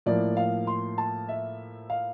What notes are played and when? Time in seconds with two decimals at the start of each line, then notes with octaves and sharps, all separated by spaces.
0.06 A2 F3 A#3 D5
0.37 F5
0.67 C6
0.98 A5
1.29 E5
1.90 F5